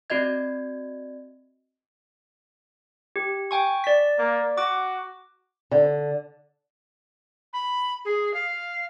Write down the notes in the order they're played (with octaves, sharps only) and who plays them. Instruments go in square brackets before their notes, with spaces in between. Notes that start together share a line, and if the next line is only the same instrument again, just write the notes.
[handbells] C4 F#4 D5 D#5 G#6
G4
G5 G#5 C#6
D5 B6
[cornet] A#3
[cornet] F#4 [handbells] D6
[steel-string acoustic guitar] D3
[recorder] B5
G#4
F5